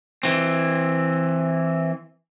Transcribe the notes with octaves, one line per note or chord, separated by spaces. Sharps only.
E3 C4